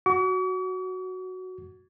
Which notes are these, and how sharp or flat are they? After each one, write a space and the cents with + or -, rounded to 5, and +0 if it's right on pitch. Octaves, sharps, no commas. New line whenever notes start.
F#4 +0 C#6 +45